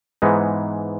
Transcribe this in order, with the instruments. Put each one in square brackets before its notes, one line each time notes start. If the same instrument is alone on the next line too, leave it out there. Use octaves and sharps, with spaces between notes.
[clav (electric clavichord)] G#2 E3 G#3 B3 D#4